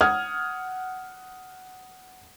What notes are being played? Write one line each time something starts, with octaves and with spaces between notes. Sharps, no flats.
F#5 D#6 F6 G#6